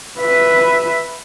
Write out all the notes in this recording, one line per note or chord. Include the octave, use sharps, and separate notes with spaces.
B4 E5